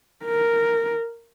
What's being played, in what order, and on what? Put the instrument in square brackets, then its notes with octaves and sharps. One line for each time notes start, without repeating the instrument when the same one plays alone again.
[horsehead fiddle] A#4